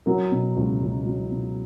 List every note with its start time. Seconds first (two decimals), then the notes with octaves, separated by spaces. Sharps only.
0.06 F#3 A#4
0.31 B2
0.57 C#2
0.82 C#2
1.06 F#3
1.31 B2